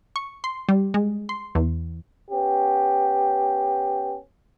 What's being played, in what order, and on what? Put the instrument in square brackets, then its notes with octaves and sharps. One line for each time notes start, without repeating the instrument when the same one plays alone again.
[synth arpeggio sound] C#6
C6
G3
G#3
C6
E2
[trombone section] B3 C#4 G4